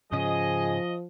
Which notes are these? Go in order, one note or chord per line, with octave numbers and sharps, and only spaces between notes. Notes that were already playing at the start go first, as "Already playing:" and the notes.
G#2 C#3 F3 C#4 G#4 D#5